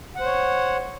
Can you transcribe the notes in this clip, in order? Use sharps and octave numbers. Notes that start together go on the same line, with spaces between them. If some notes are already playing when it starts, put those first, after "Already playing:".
C5 C#5 F#5